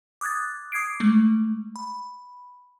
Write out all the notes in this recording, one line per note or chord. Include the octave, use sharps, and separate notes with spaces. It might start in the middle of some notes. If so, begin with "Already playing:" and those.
D6 D#6 F#6 G#6 A6
D6 D#6 G#6 C7 D7
G#3 A3
B5